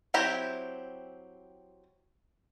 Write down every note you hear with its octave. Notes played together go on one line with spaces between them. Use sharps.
F#3 C4 E4 G4 A#5